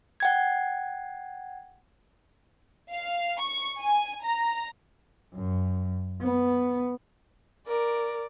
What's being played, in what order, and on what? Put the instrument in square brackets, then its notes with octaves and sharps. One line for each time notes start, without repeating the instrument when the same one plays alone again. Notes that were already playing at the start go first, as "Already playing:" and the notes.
[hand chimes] F#5 G5 G#6
[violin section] F5
C#6
G#5
A#5
[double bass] F#2
B3
[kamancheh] A#4 D5